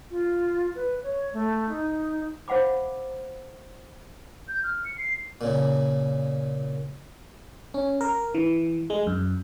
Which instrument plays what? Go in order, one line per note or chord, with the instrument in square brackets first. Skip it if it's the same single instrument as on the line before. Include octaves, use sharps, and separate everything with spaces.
[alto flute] F4
B4
C#5
A3
D#4
[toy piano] C5 F5 F#5 B5 D6
[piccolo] G6
F6
C#7
C7
[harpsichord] A#2 C#3
[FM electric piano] C#4
A#4
E3
G#3
F#2